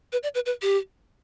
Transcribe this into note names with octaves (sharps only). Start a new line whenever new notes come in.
B4
D5
B4
B4
G4